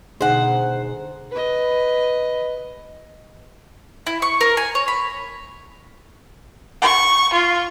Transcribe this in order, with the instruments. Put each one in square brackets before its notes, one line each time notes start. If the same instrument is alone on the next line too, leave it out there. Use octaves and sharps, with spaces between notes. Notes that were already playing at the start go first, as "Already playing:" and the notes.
[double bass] B2 [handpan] D3 D#4 G#4 [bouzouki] C5 F#5
[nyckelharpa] B4 D#5
[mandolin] E4
C#6
A#4
G#5
C#5
B5
[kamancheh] C#6
F4